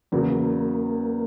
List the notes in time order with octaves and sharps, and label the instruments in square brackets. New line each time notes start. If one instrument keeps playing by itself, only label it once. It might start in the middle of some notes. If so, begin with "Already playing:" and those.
[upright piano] E2 C#3 F#3 [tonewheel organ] A#3